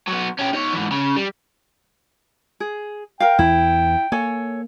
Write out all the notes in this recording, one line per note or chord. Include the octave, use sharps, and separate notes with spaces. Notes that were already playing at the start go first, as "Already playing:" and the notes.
F#3 B3
C#4 G4
D#4 C#5
G#2 E3
C#3
G3
G#4
A#4 F5 G5
E2 E3 E4
A#3 A4 C#5 G#5